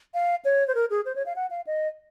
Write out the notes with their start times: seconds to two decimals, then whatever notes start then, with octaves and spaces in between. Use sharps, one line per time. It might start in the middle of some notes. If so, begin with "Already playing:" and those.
0.14 F5
0.45 C#5
0.68 C5
0.75 A#4
0.90 G#4
1.05 C5
1.16 C#5
1.26 F5
1.36 F#5
1.51 F5
1.67 D#5